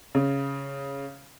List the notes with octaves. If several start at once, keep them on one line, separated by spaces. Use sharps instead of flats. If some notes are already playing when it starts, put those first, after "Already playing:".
C#3